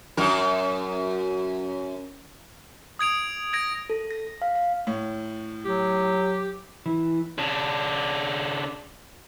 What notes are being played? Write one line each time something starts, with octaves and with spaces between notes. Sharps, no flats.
F#2 A#4
D#6 G#6 D7 F7
G#6 A#6 D7
A4
A#6
F5
F5
A2 C#5
F#3 G4
E3
C#3 D4